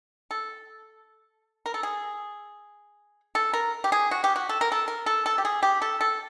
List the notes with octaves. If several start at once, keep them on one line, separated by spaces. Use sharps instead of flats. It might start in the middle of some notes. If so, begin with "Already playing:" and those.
A4
A#4
A4
G#4
A4
A#4
G4
G#4
F#4
G4
F#4
A4
A#4
A4
A#4
A4
A4
G4
G#4
G4
A4
A4